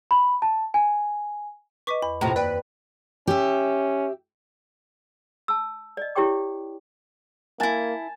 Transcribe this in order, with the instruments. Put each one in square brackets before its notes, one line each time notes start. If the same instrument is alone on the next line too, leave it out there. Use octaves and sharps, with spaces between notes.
[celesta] B5
A5
G#5
[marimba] B4 D#5 [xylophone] C#6 D6 B6
[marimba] E2 [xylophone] B5
[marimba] F#2 [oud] A2 C3 F3 [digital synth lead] A#5
[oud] D#2 [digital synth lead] B4 [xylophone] D5 G5
[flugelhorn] C#4 [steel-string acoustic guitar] G4 E5
[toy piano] A5 E6
D5 D#5
E4 G4 C#5 G5 D6
[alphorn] A#3 [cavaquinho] E4 F#4 [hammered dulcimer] G#5 A5